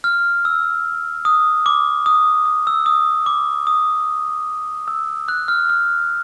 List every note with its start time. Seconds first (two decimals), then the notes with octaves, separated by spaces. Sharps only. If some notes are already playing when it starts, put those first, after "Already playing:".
0.04 F6
0.45 E6
1.25 D#6
1.66 D6
2.06 D#6
2.46 D#6
2.67 E6
2.86 D#6
3.26 D6
3.67 D#6
4.88 E6
5.28 F#6
5.48 F6
5.70 F6